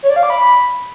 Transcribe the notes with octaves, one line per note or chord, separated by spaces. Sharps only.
C#5
D5
F5
D6
B5